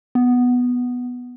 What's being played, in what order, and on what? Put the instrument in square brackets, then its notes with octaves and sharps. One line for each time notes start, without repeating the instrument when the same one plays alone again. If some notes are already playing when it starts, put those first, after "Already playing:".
[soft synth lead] B3